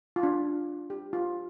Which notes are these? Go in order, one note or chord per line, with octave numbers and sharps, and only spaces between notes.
F4
D4
G4
F4